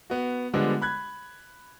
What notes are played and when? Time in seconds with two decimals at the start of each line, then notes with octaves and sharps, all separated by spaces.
0.10 B3 F#4
0.54 D3 F3 G3 G#3 B3 D4
0.82 B5 F#6 G#6